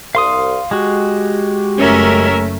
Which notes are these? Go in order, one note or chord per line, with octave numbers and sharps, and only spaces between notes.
C2 F5 C6 D#6
G#3 F#4 G4
F#1 A3 C#4 A#4 E5